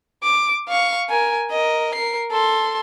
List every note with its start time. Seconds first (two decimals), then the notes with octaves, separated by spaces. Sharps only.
0.23 D6
0.68 F5 C#6
1.09 A#4 G#5
1.51 A#4 D#5
1.95 A#4 C7
2.32 A4 C6